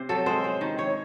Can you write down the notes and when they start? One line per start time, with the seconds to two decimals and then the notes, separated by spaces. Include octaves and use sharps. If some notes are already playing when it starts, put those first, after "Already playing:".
Already playing: C3 C5
0.09 F#3 A4
0.26 G#3 C5
0.44 G#3
0.61 D#3
0.78 D#3 C#5